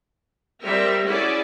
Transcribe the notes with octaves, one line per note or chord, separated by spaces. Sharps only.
G3 C4 A#4 E5
C#4 E4 F#4 G#4 D5